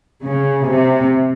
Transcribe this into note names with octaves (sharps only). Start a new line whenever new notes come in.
C#3
C3